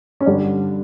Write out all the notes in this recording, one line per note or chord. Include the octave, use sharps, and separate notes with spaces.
C#4
G2 D3 G3 D4